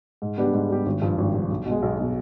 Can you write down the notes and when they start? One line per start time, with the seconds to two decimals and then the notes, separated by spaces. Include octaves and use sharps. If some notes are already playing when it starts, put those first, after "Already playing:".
0.22 G#2
0.38 G3 B3 D4 G4
0.54 G#2
0.69 G3 B3 D4 G4
0.86 G#1
1.02 G2 F3
1.18 G#1
1.34 G2 F3
1.50 B1
1.66 B2
1.71 G#3
1.82 B1
1.99 B2 G#3